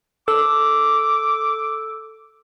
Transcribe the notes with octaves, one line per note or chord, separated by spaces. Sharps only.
A4 D6 E6